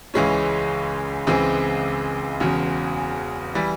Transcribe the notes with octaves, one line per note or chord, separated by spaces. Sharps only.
C#2 C#3 E3 G#3 C#4
C#2 C#3 E3 G#3 C4
E1 E2 C#3
E3 G3